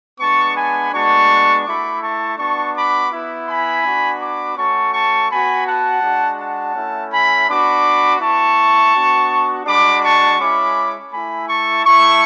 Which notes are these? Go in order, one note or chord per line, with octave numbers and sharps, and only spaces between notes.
G#3 B3 D4 A5 C#6
G#5 B5
G#3 B3 D4 F#4 A5 C#6
A3 E4 B5 D6
A5 C#6
B3 D4 F#4 A5 C#6
B5 D6
B3 E4
G#5 B5
B3 D4 F#4
B5 D6
A3 C#4 F#4 A5 C#6
A5 C#6
B3 F#4 G#5 B5
F#5 A5
G#3 D4 F#4
F#5 A5
A3 C#4 E4
G#5 B5
B3 D4 F#4 B5 D6
B3 E4 A5 C#6
B3 D4 F#4
G#3 D4 F#4 B5 D6
A5 C#6
G#3 C#4 E4 B5 D6
A3 E4 G#5 B5
A5 C#6
A3 E4 A5 C#6